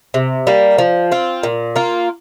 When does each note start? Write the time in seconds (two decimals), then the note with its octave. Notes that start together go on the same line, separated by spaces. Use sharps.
0.14 C3
0.47 G3 A#3
0.78 F3
1.12 C4 F4
1.43 A#2
1.76 A#3 F4